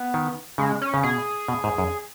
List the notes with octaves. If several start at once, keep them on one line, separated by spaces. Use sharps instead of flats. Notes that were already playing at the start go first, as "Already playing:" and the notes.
Already playing: B3
D#3
C#3 G#3
C#4
C#3
B2 G#4
B2
G#2
F#2